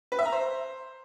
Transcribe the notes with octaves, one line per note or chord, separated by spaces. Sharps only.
B4
E5
A#5
C5